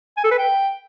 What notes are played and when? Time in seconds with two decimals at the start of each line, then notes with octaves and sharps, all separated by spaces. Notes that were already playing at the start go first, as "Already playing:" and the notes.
0.17 G#5
0.24 A4
0.31 B4
0.38 G5